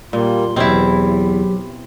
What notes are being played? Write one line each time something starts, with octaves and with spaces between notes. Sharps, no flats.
A#2 G3 A#3 F4 C6
E2 B2 F#3 C4 E4 G4 C#5